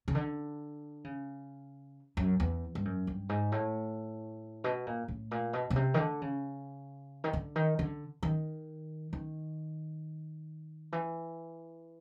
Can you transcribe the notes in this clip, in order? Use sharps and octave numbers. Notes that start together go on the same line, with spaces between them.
C#3
D3
C#3
F#2
E2
G2
F#2
G2
G#2
A2
B2
A#2
A2
A#2
B2
B2
C3
D#3
D3
C#3
D#3
D3
D#3
D3
D#3
D#3
E3